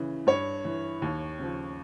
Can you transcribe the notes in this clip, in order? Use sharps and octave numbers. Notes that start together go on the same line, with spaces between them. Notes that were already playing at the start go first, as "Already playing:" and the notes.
Already playing: C#3 E3
G2 C#5
E3
D#2
C#3 F3